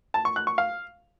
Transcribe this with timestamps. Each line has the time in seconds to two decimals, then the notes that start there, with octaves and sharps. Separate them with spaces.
0.14 A5
0.25 C#6
0.36 F#6
0.47 C#6
0.58 F5